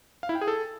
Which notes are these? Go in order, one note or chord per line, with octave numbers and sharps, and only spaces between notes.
F5
E4
G5
G#4
A4